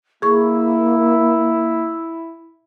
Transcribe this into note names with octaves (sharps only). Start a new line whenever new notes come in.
A#3 E4 G#4 C#6